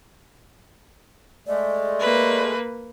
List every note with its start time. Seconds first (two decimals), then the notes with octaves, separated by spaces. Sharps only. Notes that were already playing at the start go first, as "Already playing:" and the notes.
1.47 G#3 A3 D5
2.00 A#3 B4